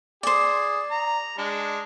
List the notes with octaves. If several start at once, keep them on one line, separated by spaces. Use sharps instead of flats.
G#4 C5 D5
A#5
G#3 D4